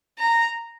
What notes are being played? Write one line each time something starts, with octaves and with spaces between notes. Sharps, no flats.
A#5